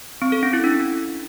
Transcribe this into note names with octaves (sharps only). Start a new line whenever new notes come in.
C4
A4
C#4
E4
D4